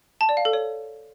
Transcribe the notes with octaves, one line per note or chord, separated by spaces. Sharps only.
A5
D5
F5
A4
C#5